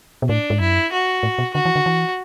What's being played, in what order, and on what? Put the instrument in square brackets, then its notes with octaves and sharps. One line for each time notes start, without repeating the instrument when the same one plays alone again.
[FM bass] B2
[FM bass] A2 [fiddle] D4
[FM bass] G#2
[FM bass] F#2 [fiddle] E4
[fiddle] F#4
[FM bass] A2
B2
[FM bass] D3 [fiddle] F#4
[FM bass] E3
D3
E3